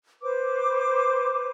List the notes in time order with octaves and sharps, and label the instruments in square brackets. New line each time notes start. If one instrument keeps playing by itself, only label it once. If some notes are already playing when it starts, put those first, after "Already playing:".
[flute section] B4 C5 D6